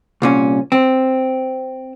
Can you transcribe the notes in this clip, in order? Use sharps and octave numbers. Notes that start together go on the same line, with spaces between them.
C2 A#2 C#4
C4